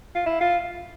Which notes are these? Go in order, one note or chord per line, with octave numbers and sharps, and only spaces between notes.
F4
E4
F4